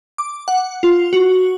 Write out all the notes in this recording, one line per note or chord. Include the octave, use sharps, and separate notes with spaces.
D6
F#5
F4
F#4